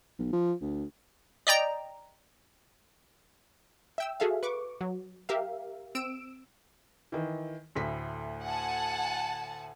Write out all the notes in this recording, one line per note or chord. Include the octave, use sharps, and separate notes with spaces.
B1
F3
D2
D5 D#5 G5 A#5
E5 G5 E6
F#4 G#4 A4 E5 F5
B4 C#6 D6
F#3
G4 A#4 E5 F5
C4 E6 D7 E7
D#3 E3
D2 A2 B6
F#5 G#5 A5